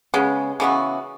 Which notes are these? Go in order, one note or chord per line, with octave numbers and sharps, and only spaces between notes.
C#3 G#3 B3
C#3 E3 B3 F#4